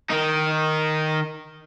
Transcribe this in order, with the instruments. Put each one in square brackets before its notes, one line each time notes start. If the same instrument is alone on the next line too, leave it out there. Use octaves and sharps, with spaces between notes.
[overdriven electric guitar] D#3 D#4